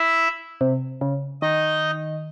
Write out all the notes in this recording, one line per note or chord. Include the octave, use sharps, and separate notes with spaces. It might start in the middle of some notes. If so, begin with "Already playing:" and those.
Already playing: E4 E5
C3
C#3
D#3 D#4 D#5